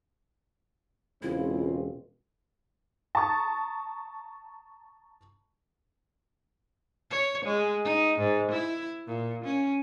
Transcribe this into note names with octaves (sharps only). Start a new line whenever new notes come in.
E1 C#2 C4 E4 F4
A5 A#5 C#6 D#6 A6
C#5
G#3
D#4
G#2
E4
A#2
C#4